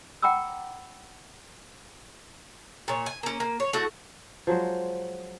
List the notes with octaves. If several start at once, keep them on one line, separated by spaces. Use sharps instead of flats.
F#5 G5 A#5 B5 D6 E6
A#2 C#5
G#5
A#3 C#4
A#3
C#5
A3 E4 F#4
F3 F#3 G#3 C5